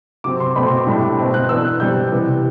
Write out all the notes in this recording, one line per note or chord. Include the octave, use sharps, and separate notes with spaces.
C3 F#3 C4 D6
C6
B2 A3 C4 B5
C6
D6
A2 G3 D4
B2 A3 C4
F#6
E3 B3 D4 E6
F#6
B2 G3 C4 G6
C3 E3 G3 B3